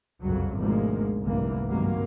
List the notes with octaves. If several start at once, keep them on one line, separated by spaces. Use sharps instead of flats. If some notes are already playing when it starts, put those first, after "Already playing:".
F#1 C2 F2 F#3
G#1 D2 B2 F3 G#3 A#3
F1 C2 G#2 D3 E3 A#3
G#1 G2 C#3 F#3 G#3 A#3